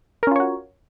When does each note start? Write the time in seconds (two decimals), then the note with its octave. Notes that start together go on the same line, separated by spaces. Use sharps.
0.23 A#4
0.27 C#4
0.31 F4
0.36 C#5
0.40 F#4